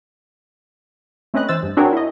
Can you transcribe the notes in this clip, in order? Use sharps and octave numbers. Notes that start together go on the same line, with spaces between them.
A3 C4 C#4 B4 D#5 F#6
E3 C5 E6 A6
G2
C4 D4 F#4 G#4 A#4 C#5
E4 D#5